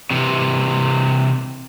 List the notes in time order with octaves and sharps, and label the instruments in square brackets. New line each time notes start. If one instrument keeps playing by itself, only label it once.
[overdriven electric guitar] C3 E3